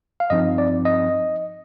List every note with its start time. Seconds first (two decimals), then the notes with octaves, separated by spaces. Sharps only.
0.20 F5
0.30 G2 F3 C4 D#4 D#5
0.58 D5
0.85 D#5